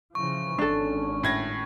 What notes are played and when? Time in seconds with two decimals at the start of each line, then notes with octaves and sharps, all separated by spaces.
0.15 C#3 E3 F3 C#6
0.58 G#1 C#4 D4 A4
1.23 A2 G#6 A#6